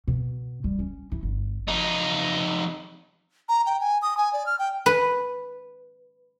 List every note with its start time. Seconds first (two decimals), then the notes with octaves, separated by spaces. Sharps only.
0.07 B2
0.64 G3
0.79 C#4
1.12 E4
1.23 G1
1.68 F2 D#4
3.49 A#5
3.66 G5
3.80 G#5
4.02 D#6
4.17 G#5
4.33 D5
4.46 F6
4.59 G5
4.86 B4